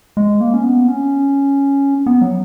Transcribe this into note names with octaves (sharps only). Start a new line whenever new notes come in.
G#3
A#3
C#4
B3
C#4
B3
F#3